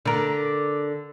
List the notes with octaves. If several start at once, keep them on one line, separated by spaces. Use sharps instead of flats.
D3 A#4